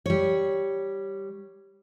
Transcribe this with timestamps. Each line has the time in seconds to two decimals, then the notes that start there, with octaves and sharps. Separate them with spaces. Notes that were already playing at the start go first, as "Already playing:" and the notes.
0.06 G3 C#5